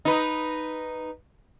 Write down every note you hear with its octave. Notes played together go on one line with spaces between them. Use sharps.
D#4 B4